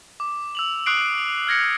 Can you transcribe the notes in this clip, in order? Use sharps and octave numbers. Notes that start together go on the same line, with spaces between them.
D6
E6 F7 F#7
C#6 D#6 F#6 C7 D7 F#7
F6 G#6 A#6 C#7